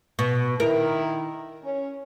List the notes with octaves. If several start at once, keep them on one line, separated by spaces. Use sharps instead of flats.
B2
D#3 E4 A#4
C#4